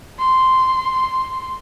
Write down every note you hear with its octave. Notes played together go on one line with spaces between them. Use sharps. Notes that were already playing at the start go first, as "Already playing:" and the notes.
C6